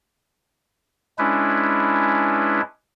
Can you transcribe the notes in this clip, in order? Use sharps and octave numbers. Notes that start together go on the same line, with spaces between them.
G#3 C#4 D4 E4 B4